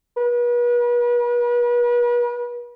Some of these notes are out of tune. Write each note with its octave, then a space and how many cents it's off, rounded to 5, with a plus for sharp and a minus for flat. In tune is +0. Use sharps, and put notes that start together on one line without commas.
B4 -40